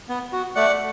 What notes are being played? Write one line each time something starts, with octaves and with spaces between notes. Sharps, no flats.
B3
F#4
A3 D5 F#5